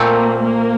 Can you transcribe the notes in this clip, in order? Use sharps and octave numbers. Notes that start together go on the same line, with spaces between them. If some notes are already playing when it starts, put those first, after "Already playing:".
Already playing: A#2 A3 A#3 C4
A#3